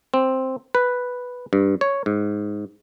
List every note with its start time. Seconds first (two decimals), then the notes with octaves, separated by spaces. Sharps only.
0.14 C4
0.75 B4
1.53 G2
1.81 C#5
2.06 G#2